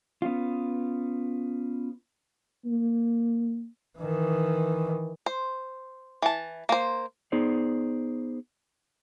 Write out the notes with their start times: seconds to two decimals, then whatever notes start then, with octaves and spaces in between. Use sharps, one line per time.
0.22 B3 C#4 F4
2.65 A#3
3.98 D#3 E3
5.26 C5
6.22 E3 A5
6.69 A#3 C5
7.32 B3 D#4 G#4 C5 D5